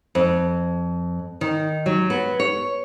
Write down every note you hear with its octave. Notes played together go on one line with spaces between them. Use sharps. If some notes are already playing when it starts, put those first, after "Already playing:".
F2
D#3
F#3
B3
C#5